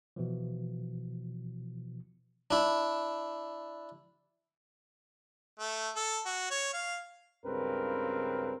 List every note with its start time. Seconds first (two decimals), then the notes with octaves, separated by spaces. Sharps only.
0.16 B2 E3 F3
2.51 D4 E4
5.59 A3
5.96 A4
6.26 F#4
6.51 C#5
6.74 F5
7.45 C#2 G2 C#3 C4 A#4 B4